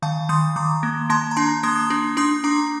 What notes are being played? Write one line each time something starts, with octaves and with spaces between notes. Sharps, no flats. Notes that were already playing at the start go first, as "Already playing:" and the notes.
D#3 F5 A5
D#3 C6 D#6
D#3 A#5 D6
A#3
A#3 A5 C6
A#5
D4 A5 C6
A#3 C6 D#6
D4
D4 C6 D#6
D4 A#5 D6